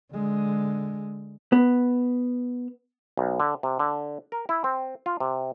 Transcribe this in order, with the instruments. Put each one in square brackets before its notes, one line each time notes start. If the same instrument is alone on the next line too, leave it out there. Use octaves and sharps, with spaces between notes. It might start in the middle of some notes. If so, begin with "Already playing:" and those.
[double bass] D3 G#3
[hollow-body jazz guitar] B3
[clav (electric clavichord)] B1
D3
C3
D3
A#4
E4
C4
F4
C3